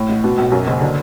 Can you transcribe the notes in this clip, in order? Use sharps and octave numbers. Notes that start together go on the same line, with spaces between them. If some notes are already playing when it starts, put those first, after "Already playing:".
Already playing: A2
A1
B2
B1
F#2
F#1
D3